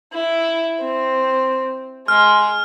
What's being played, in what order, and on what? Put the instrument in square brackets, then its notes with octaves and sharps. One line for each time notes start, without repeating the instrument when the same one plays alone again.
[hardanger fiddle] E4
C4
[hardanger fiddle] G#3 [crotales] F6